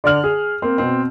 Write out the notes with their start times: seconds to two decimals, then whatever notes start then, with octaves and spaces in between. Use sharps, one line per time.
0.04 D3 D5 F6 F#7
0.24 G#4
0.62 A#3 C4
0.78 B2 C4